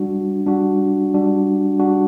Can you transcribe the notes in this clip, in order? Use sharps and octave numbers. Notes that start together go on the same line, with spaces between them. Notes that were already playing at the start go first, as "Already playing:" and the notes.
Already playing: G3 D4 F#4
G3 D4 F#4
G3 D4 F#4
G3 D4 F#4